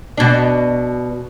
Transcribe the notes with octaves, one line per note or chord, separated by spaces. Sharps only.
B2 D4